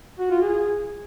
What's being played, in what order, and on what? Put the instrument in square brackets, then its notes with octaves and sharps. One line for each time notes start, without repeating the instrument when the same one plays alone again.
[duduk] F#4
F4
G#4